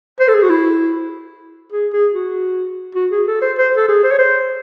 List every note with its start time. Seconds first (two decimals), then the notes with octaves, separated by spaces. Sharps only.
0.20 C5
0.28 A4
0.35 G#4
0.43 F#4
0.50 E4
1.72 G#4
1.93 G#4
2.14 F#4
2.96 F#4
3.11 G#4
3.27 A4
3.42 C5
3.58 C5
3.77 A4
3.88 G#4
4.04 C5
4.11 C#5
4.19 C5